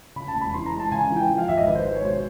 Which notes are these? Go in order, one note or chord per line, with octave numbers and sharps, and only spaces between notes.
C#3 B5
A5
E1
B5
E3 C6
A#5
G#3
A5
C#3 G#5
G#5
E3
G5
F3
F5
G#1 E5
D#5
D#3 B4
C5
G#3 C5
C#5
B2 C5